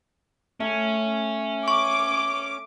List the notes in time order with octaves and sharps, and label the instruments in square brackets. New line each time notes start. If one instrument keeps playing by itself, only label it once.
[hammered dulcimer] A3 [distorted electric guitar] C#4
[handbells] C#6 [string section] D6